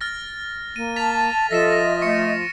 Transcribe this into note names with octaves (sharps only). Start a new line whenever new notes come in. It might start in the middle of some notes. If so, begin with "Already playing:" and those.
F6 A6 A#6
A#3 D#7
A5 A6 B6 F7
F3 A4 D#5 E5 A#6 B6 E7
A#6
A3 C#6 C#7